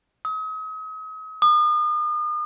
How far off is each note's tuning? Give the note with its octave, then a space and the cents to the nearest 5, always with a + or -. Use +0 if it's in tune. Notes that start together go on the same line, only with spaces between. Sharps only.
D#6 +40
D#6 -40